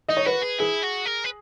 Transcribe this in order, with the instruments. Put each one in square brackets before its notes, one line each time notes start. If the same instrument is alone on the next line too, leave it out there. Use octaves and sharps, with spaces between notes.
[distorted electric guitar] D#4 [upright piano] D#5
[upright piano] C#5
[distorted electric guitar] F#4 [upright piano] B4
[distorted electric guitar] G#4
[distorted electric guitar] E4 [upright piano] G#4
[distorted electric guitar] F#4
A#4
B4